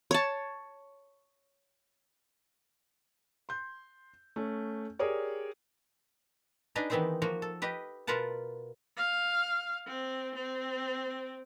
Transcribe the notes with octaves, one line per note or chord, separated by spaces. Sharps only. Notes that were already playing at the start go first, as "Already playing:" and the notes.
C#5 A5
C6 G6
A3 C#4
G4 G#4 A#4 C#5 D5
D4 D#4 G#4 B4 D#5
D#3 E3 B3 C4 D#4 C5
F3 A#3 F#4
A4
G4 B4 D#5
B2 F4 A#4 B4 F#5 A5
F5
C4
C4